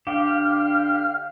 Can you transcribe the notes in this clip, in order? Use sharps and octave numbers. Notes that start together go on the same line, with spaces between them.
D3 G4 F5